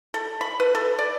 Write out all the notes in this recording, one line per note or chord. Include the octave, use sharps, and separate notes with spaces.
A4
B5
B4
A4
D5